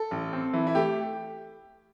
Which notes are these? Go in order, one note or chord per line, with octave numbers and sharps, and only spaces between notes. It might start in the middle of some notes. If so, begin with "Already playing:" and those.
Already playing: A4
A1
C4
E3
E4
A3 G4